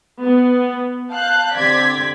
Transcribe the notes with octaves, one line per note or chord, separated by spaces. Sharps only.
B3
F5 A5 F#6 G6
D3 C4 G4 D5 G#6 B6